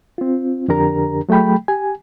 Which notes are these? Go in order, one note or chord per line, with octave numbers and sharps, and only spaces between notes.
C4 F4
F2 D3 D4 G4 A#4 A#5
F#3 A3 G#4 G5 B5
G4 G#5